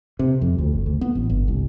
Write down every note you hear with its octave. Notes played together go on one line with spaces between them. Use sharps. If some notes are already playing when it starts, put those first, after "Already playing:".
C3
F2
D2
F#1
D2
B3
A1
G1
C2